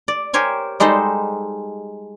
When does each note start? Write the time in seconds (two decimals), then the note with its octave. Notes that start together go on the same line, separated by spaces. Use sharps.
0.08 D5
0.33 G4 A#4 C5 C#5 G#5
0.80 G3 G#3 D#4 A4 C5